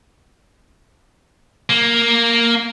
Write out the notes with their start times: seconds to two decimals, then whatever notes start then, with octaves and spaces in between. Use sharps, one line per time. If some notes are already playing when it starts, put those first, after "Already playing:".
1.70 A#3